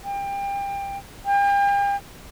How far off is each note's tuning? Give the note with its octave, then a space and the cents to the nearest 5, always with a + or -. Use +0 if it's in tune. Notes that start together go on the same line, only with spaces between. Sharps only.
G5 +25
G5 +40